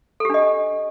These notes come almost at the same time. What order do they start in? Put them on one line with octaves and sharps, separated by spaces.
A4 G4 D4 D#5